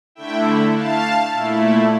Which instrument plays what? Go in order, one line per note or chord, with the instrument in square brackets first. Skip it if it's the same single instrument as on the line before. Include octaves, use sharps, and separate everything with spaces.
[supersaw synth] D3 A3 E4 E5 G5
F5 A5
A#2 A3 E4